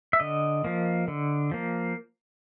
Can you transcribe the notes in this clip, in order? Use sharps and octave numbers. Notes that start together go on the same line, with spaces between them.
E5
D3 D#5
F3 A#3
D3
F3 A#3